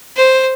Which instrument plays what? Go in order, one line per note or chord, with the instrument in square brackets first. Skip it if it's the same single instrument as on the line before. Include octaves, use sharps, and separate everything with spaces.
[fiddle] C5